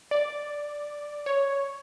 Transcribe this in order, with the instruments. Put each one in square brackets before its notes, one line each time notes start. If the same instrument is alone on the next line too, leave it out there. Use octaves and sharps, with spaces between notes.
[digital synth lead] D5
C#5